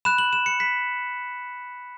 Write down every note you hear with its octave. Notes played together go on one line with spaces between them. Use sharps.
B5 F#6 E7
F#7
E7
C#7
B6